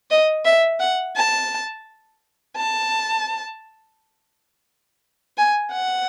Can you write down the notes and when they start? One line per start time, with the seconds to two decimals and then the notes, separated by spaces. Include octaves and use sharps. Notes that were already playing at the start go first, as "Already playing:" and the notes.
0.10 D#5
0.45 E5
0.80 F#5
1.16 A5
2.57 A5
5.38 G#5
5.72 F#5